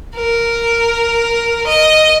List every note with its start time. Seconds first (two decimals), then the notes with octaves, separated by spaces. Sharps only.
0.16 A#4
1.67 D#5